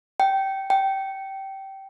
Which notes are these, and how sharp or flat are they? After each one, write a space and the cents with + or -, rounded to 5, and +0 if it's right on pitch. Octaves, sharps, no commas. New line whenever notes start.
G5 -20
G5 -20